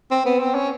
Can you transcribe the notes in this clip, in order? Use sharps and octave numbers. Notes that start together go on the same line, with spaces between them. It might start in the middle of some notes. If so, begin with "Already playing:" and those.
C4
B3
C4
C#4